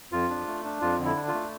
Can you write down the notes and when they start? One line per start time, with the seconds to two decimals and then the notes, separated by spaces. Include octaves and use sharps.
0.12 F2 F4
0.30 D4
0.47 A3
0.64 D4
0.81 F2 F4
0.99 D3
1.05 E4
1.16 D4
1.28 F4
1.34 A3